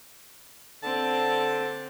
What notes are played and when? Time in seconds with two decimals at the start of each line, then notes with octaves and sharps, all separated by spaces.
0.83 D3 C4 A5